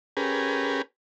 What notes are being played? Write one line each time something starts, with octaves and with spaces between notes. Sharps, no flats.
C#4 G4 G#4 A#4 B4